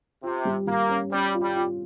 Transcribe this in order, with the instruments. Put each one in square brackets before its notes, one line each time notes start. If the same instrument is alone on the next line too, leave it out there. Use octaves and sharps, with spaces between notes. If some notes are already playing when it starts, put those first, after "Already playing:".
[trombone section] C3 [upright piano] F4
[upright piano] G3
[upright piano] G3 [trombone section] A#3
[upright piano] C#4
[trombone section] G3 [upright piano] C#4
[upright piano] F4
[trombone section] G3
[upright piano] F4